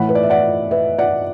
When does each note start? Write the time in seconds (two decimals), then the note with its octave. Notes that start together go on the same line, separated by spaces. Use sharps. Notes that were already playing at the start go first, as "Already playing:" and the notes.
Already playing: A2 E3 A3 F#5 B5
0.09 B4
0.15 D5
0.23 E5
0.30 D5 F#5
0.71 B4 E5
0.98 D5 F#5